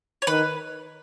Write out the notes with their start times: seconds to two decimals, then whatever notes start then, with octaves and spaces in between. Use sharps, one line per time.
0.22 C#5
0.27 D#3 B4